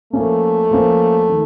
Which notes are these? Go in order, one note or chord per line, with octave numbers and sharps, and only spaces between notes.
F3 A3 A#3 C#4
F3 A#3 C#4
D#3